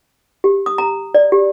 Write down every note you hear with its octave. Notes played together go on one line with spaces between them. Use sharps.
G4
D#6
A#5
D5
G4